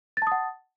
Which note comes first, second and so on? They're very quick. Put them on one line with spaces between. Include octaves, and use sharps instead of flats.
A6 A5 D#6 F#5